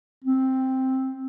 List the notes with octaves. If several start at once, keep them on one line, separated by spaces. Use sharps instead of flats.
C4